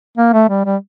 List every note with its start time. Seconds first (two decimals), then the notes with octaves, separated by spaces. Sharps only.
0.17 A#3
0.33 A3
0.49 G3
0.65 G3